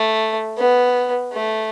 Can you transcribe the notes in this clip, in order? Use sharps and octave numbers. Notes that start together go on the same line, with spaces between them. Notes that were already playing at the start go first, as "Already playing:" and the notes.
Already playing: A3
B3
A3